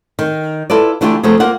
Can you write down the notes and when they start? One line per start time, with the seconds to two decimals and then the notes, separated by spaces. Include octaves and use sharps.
0.19 D#3
0.70 E4 F4 A4 B4 D5
1.01 D3 E3 A3 E4 F4 G4
1.23 C3 F3 A3 B3 G#4
1.40 A#3 F4 F#5